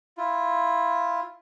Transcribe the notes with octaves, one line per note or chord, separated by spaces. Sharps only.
E4 F4